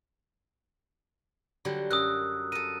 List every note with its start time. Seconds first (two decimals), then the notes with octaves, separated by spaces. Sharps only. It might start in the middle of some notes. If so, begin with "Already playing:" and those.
1.65 D3 F#3 G3
1.91 F#2 A#4 D#6 E6 F#6
2.52 A4 A#4 D#7